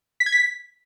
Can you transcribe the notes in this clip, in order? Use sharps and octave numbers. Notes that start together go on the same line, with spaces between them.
B6
G#6
B6